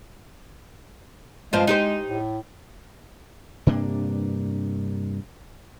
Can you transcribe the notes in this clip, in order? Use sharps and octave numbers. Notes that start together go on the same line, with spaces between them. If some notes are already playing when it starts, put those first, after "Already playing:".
G2 F3 G#3 C4
D#4 G4 C5
A2
G2 C3 A#3 D4